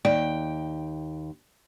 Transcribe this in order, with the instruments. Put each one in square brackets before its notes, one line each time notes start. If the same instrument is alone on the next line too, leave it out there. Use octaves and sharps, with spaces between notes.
[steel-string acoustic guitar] D#2 G5 [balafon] D5